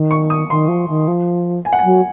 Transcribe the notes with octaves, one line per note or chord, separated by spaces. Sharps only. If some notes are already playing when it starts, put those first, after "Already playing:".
Already playing: D#3
C#6
D#6
D#3 C6
F3
D#3
F3
G#5
F#5
F#3 G#5